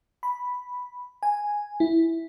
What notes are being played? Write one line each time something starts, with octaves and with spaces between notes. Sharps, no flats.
B5
G#5
E4